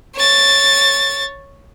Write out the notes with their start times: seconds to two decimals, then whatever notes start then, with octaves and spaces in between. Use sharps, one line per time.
0.16 C#5 A6